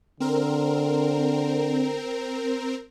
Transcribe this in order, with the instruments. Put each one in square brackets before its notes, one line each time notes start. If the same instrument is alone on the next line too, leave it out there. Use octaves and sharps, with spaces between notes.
[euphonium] D3 [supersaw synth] C4 A#4